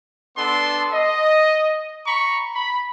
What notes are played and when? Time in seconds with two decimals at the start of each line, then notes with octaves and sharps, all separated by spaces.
0.36 B3 D4 A4 C6
0.93 D#5
2.07 A#5 B5 C#6
2.53 B5